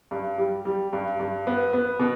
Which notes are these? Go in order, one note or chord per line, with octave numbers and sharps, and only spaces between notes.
G2
G3
G3
G2
G2
B3
B3
B2